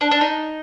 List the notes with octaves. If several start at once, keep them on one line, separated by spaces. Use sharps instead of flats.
D4
D4
D#4